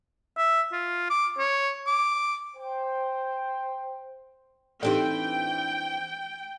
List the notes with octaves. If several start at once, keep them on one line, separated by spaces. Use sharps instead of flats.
E5
F4
D6
C#5
D6
C5 G5
E3 C4 D4 D#4 G4 A4 G5